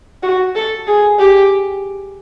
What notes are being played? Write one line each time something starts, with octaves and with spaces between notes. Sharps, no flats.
F#4
A4
G#4
G4